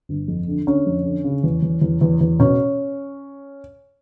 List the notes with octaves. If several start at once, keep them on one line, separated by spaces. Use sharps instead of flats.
G1
F2
D3
D3 C#4
F2
D3
C#3
E2
E2
E2
E2
E2
B2 C#4